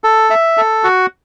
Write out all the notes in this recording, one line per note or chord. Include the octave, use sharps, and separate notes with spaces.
A4
E5
A4
F#4